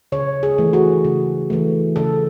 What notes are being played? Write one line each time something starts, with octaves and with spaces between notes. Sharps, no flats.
C#3 C#5
G#4
E3 A3
F#4
C#3
E3 A3
C#3 A4